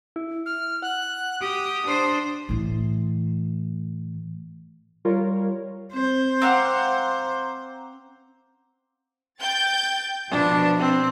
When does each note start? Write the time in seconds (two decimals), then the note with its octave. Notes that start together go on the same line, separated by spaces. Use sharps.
0.16 E4
0.46 F6
0.82 F#5 F#6
1.41 G4 D#6
1.86 D4 C5
2.49 A2 E3
5.05 G3 F4 A#4 C#5
5.93 C4 C5
6.42 C4 F5 F#5 A#5 D6
9.41 G5 G6 A6
10.31 B2 F3 D4
10.79 C4